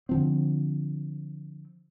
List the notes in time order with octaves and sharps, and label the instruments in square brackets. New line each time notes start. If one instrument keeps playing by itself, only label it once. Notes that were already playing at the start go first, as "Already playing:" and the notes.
[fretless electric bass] D3 F3 C4